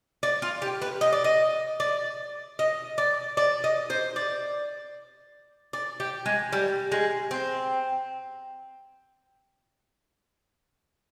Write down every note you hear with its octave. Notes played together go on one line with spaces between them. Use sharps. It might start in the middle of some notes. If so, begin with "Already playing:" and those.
D5
F4
G4
B4
D#5
D5
D#5
D5
D#5
D5
D5
D#5
C5
D5
D5
G4
G#3
G3
G#3
C4